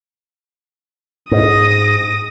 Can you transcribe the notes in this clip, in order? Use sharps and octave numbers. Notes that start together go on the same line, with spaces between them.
G#2 D#6 A#6